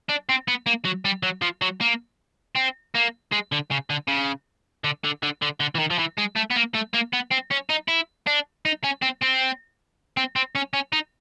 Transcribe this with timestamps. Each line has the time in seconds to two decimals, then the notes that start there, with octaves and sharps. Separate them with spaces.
0.09 D4
0.29 C4
0.48 B3
0.66 A#3
0.85 F#3
1.05 G3
1.23 F#3
1.42 F3
1.62 F#3
1.81 A#3
2.56 C4
2.95 A#3
3.32 G#3
3.52 D3
3.71 C#3
3.90 D3
4.08 C#3
4.84 D3
5.04 D3
5.23 D3
5.42 D3
5.60 D3
5.75 E3
5.79 D#3
5.91 F3
5.99 E3
6.18 G#3
6.36 A3
6.51 B3
6.56 A#3
6.75 A3
6.94 A#3
7.13 B3
7.32 C4
7.51 C#4
7.70 D#4
7.88 E4
8.27 D4
8.65 D#4
8.84 C#4
9.02 C4
9.23 C4
10.17 C4
10.36 C4
10.55 C#4
10.73 C#4
10.93 D#4